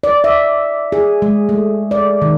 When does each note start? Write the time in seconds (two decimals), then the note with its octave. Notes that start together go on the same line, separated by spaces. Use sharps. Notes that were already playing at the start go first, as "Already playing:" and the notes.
0.03 D5
0.24 E5
0.92 G#4
1.22 G#3
1.49 A3
1.91 D5
2.22 D#3